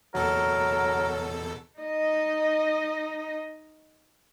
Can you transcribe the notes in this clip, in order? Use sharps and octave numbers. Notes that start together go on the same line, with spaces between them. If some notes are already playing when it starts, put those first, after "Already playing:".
E2 B2 F#3 A4 A#4
D#4 D#5